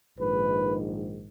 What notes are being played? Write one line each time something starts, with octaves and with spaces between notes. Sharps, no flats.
A#1 G#2 D#3 B4